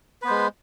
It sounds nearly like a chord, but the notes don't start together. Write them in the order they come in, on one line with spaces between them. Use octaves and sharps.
B4 B3 C5 G#3